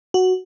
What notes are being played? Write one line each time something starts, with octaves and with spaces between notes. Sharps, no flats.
F#4